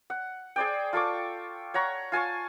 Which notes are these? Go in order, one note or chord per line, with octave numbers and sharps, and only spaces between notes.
F#5
G#4 C5 D5 G5
F4 A4 C#6 D6
C#5 F#5 A#5 C#6
F4 G#5 A5 C#6